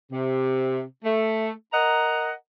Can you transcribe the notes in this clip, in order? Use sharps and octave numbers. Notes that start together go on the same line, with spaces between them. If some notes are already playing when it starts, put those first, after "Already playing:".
C3
A3
A#4 D#5 F#5 A#5